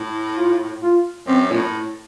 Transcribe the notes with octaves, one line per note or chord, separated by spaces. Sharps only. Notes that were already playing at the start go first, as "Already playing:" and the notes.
Already playing: A2
F4
F4
F#2 C4
A#2
A2